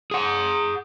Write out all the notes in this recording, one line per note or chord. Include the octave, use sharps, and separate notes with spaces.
G#4 F#5